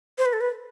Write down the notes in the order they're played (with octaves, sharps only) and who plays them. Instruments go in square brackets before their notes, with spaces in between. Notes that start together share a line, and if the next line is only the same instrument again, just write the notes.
[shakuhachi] C5
B4
A4
B4